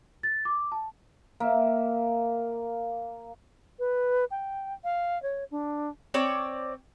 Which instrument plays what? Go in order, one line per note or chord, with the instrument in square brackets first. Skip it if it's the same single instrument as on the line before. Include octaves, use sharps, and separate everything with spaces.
[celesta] A6
D6
A5
[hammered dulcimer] A#3 E5
[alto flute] B4
G5
F5
C#5
D4
[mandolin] C4 C#5 D5 D6